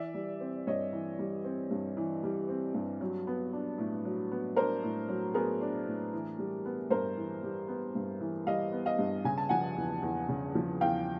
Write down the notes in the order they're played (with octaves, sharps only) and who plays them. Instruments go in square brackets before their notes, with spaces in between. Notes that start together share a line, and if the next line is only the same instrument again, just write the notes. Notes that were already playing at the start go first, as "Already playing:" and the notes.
Already playing: [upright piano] E3 D5 E5
G3
C4
G2 C#5 D#5
E3
G3
C4
G2
E3
G3
C4
G2
F#3
B3
D4
A2
F#3
B3
D4 A#4 C5
A2
F#3
B3 G#4 A#4
D4
A2
E3
G3
B3
G2 A#4 C5
E3
G3
B3
G2
E3
G3 D#5 F5
B3
D#5 F5
G2
C#3 G#5
A5
F3 F#5 G#5
E2
E2
C#3
F3
E2 F5 G5